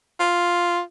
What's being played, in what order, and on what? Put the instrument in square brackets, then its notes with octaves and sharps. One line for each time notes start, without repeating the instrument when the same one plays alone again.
[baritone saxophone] F4